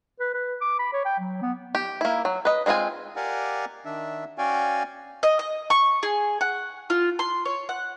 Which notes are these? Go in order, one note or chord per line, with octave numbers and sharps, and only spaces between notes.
B4
B4
D6
B5
C#5
G5
F#3
B3
G4
A#3 E4
F#3
B4 D#5
G3 G#3 C4 F4 G#5
G4 A#4 D5 F5 F#5 G#5
D#3 D4 E5
C#4 F#4 D5 F5 G5 G#5
D#5
D#5
C#6
G#4
F#5
F4
C6
C#5
F#5